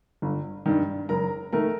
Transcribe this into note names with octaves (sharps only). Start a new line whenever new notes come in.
G1
G2 D#3
F#1 A#4 A#5
D#3 A3 A#4 A#5